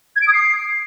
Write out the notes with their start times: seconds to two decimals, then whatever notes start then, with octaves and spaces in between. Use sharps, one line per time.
0.16 G#6
0.22 D7
0.27 D#6
0.33 C7